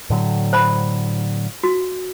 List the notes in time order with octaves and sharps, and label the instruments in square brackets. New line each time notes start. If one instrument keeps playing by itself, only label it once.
[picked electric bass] A2 D3 F#3
[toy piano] C5 A5 B5
F#4